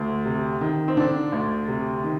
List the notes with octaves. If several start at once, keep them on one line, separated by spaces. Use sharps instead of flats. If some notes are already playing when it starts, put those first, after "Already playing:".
Already playing: D2
C3
D#3
C4
D3 D4
D2
C3
D#3